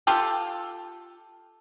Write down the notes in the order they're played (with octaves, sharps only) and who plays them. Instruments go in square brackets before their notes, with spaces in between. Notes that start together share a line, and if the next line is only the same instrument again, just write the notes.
[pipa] F4 G4 A4